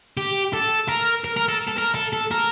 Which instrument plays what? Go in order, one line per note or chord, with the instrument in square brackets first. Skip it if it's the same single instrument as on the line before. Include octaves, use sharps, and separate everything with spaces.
[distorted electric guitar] G4
A4
A#4
A#4
A#4
A4
A4
A#4
A4
A4
A#4